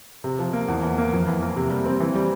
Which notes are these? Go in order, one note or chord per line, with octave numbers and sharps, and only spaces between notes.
C3
F3
A#3
E2
E3
A#3
F2
E3
A#3
C3
G3
C4
E3
G3